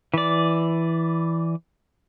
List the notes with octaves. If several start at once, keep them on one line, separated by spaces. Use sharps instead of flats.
E3 D5